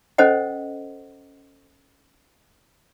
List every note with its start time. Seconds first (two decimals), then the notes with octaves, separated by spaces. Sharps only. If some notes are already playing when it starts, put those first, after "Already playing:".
0.18 C#4 A4 C5 D#5 F#5